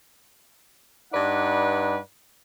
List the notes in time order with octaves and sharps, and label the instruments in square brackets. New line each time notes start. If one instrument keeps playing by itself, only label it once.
[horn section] G2 D#4 B4 D5 F#5